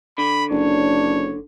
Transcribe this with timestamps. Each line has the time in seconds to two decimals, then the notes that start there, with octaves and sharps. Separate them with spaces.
0.18 D3 B5
0.51 F#1 D4 C#5